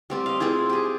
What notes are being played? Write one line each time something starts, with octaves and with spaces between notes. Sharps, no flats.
G3 C4 G4
D#5 F5
C4 E4 F4 G#4
G4 G#4